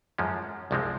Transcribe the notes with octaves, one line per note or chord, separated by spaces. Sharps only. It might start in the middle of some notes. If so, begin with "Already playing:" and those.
F#2 F3 G#3 C#4
C2 C3 F3 G#3 C4